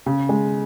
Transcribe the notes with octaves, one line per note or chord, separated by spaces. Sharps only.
C#3
G#3